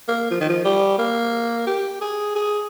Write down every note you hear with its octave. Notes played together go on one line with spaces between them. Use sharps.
A#3
F3
D#3
F3
G3
A#3
G4
G#4
G#4